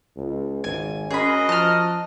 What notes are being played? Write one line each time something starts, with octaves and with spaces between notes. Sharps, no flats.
C#2
G#1 G#5
C#4 F#4 G#4 A#4 D#5 B5
F3 A5 F6